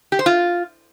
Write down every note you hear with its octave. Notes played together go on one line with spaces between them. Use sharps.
G4
C5
F4